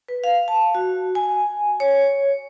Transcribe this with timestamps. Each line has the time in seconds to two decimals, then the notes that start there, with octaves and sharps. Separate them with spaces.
0.08 B4
0.24 F5
0.48 A5
0.75 F#4
1.15 G#5
1.80 C#5